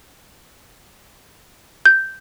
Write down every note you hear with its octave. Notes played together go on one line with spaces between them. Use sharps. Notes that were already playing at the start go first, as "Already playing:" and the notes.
G6